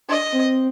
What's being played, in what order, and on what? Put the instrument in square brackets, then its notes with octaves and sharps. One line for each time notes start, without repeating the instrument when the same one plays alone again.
[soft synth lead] D4 [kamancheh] D#5
[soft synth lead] C4